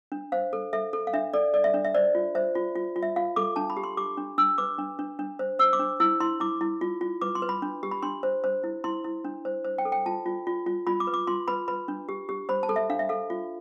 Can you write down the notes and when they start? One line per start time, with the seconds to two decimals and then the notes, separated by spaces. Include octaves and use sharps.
0.12 D4
0.32 C5 F5
0.53 A4
0.73 A4 E5
0.93 A4
1.07 F5
1.13 D4 E5
1.33 A4 D5
1.54 A4 D5
1.64 E5
1.74 D4
1.85 E5
1.95 C5 D5
2.15 F4
2.35 C5 E5
2.55 F4
2.76 F4
2.96 F4
3.03 E5
3.16 F4 F5
3.36 A4 D6
3.56 D4 A5
3.70 B5
3.77 G4
3.84 C6
3.97 G4 D6
4.17 D4
4.38 D4 E6
4.58 B4 D6
4.79 D4
4.99 D4
5.19 D4
5.39 C5
5.59 C5 E6
5.73 D6
5.79 D4
6.00 E4 E6
6.20 E4 C6
6.40 E4 D6
6.61 E4
6.81 F4
7.01 F4
7.21 B4 D6
7.35 C6
7.42 B4
7.49 B5
7.62 D4
7.83 G4
7.91 B5
8.03 D4 C6
8.23 C5
8.44 C5
8.64 E4
8.84 E4 C6
9.04 E4
9.25 D4
9.45 C5
9.65 C5
9.78 G5
9.85 A4
9.92 G5
10.06 F4 A5
10.26 F4
10.47 F4
10.66 F4
10.87 F4 B5
11.00 D6
11.07 B4
11.14 D6
11.27 F4 C6
11.48 B4 B5
11.68 B4 B5
11.88 D4
12.09 G4
12.29 G4
12.49 C5 B5
12.63 A5
12.69 A4
12.76 E5
12.90 D4 F5
12.99 E5
13.09 A4 F5
13.30 F4